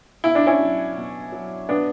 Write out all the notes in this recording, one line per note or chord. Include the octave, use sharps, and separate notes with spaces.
B2 E4
D4
C#4 E4
F#3
B2
F#3
B2 B3 D4